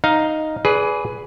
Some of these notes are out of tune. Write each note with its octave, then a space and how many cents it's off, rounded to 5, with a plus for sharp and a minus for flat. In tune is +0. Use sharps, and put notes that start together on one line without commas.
D#4 +0 F5 +0
G#4 +15 B4 +0 D5 -30